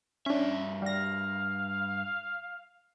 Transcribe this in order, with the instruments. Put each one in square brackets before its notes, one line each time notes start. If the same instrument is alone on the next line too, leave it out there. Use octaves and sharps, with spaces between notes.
[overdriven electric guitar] G2 E5 [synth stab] C#4 D4
[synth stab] G3 A#6 [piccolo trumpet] F5